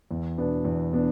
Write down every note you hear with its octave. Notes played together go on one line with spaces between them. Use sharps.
E2
B2 B3 D4
E2
B2 B3 D4